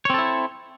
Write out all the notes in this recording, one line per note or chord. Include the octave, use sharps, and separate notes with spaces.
C4 E4 A4 C#5